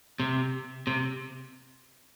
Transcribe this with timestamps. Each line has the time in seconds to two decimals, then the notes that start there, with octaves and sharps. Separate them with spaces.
0.20 C3
0.87 C3